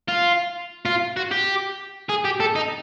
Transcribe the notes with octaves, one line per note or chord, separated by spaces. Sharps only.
F4
F4
F#4
G4
G#4
G4
A4
D#4